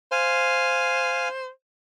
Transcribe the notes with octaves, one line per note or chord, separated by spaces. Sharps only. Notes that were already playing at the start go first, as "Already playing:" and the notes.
C5 F5 G#5